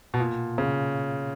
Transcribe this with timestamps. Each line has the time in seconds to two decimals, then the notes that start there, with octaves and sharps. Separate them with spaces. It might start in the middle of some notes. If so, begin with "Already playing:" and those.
0.14 B2
0.20 A#2
0.58 C#3